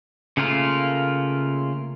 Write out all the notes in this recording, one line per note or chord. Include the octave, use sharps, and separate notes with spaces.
C#3 A3 A#3 F4 A#4